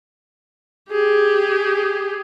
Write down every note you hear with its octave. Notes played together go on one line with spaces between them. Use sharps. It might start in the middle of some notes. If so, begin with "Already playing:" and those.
G4 G#4